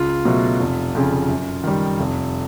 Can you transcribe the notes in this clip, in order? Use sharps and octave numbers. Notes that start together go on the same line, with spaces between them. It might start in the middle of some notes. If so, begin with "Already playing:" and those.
Already playing: C#2 F4
B2 F#3 A3
F1
F2 C#3
F#2
D#3 G3
F1